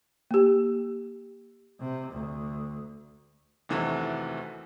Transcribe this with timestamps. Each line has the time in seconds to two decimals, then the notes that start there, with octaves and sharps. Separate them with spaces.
0.31 A#3 G4
1.80 C3
2.12 D2
3.69 F1 D#2 C3 E3 A3 F#4